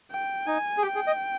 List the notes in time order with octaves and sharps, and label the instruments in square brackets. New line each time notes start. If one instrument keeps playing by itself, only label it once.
[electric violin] G5
[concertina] D#4 [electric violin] G#5
[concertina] G#4
[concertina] G4 [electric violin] G5
[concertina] G#4
D#5